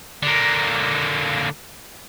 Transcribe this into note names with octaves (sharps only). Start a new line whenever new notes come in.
D3 A#3